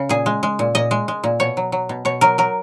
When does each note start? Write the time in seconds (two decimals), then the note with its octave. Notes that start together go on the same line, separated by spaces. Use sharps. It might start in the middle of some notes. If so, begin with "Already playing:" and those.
Already playing: C#3
0.09 A#2 G#4
0.26 G#3
0.43 G#3
0.59 A#2
0.75 A#2 D#5
0.91 G#3
1.08 G#3
1.24 A#2
1.40 B2 C#5
1.57 F#3
1.72 F#3
1.89 B2
2.05 B2 C#5
2.21 F#3 A#4
2.38 F#3 A#4